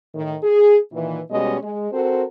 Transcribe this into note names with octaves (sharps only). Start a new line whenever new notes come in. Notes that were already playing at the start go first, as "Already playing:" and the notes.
A2 D#3
G#4
A#2 D#3 E3
B2 G3 G#3 C#4 D#5
G#3
C4 F#4 A4 A#4 C5